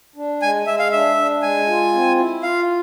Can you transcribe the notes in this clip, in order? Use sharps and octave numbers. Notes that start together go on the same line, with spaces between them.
D4
G#3 G#5
G#3 E5
F5
D4 E5
D4
G#3 G#5
F4
C4
E4
F4 F5